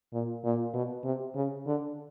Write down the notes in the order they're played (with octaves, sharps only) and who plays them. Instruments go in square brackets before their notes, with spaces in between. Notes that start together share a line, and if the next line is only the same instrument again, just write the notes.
[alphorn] A#2
A#2
B2
C3
C#3
D3